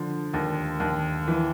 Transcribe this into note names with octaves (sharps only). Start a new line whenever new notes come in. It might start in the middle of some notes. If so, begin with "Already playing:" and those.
Already playing: D3 F3
D#2
D#2
E3